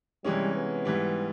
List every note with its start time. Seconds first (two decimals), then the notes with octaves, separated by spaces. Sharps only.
0.25 C3 E3 G3 G#3 C#4
0.54 B3
0.85 G#2 E3 G3